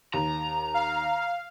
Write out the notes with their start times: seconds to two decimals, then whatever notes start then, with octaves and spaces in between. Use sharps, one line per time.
0.14 D#2 A#5
0.74 F5